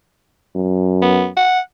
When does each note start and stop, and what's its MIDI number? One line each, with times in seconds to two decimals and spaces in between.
0.56 1.30 42
1.02 1.26 59
1.37 1.59 78